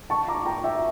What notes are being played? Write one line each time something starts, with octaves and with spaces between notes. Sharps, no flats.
A5 C#6
A#5 D6
G5 A#5
E5 G5